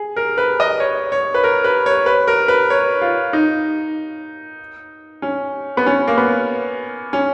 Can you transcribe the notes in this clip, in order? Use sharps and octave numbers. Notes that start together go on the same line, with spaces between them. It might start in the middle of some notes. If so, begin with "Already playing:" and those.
Already playing: G#4
A#4
B4
D#5
C#5
C#5
B4
A#4
B4
C#5
B4
A#4
B4
C#5
F4
D#4
C#4
B3
C#4
A#3
B3
C#4